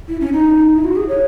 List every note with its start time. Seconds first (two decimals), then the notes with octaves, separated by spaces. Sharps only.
0.08 E4
0.21 C#4
0.33 D#4
0.75 E4
0.84 F#4
0.96 G#4
1.09 C#5